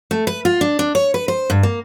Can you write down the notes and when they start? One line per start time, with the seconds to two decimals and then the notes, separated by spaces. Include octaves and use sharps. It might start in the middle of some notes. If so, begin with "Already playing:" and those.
0.11 A3
0.27 B4
0.45 F4
0.61 D4
0.79 D4
0.95 C#5
1.14 B4
1.28 C5
1.50 G2
1.63 A#3